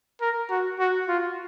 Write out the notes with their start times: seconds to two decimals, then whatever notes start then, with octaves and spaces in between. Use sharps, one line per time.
0.21 A#4
0.50 F#4
0.79 F#4
1.08 F4